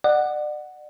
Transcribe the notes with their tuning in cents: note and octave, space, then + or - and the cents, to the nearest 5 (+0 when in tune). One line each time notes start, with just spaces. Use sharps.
D5 +35 F#5 +0